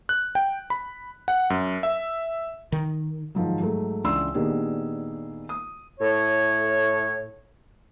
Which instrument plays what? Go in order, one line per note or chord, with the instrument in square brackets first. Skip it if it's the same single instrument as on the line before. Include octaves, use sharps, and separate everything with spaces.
[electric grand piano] F#6
G5
B5
F#5
F#2
E5
[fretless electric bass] D#3
[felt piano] G#2 D#3 F3 F#3
G#2 F#3 A3
C#2 E3 D4 C6 E6
A#2 D#3 B3 D4 G4 G#4
D#6
[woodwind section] A2 C#5